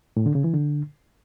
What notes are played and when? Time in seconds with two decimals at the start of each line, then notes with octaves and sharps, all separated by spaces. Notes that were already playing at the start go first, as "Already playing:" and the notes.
0.17 A2
0.26 D3
0.35 C#3
0.44 E3
0.53 D3